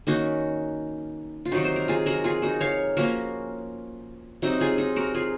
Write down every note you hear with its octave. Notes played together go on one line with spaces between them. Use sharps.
D#3 A#3 C#4 D#4 F#4
F4
C3 D#3 F#3 D#4 F#4
C5
A#4
F4 G#4
F#4 A#4
F4 G#4
D#4 F#4
C#5 F5
F3 A#3 C#4 F#4 A#4
C3 F#3 C4 D#4 F#4
F4 G#4
D#4
F#4 A#4
F4 G#4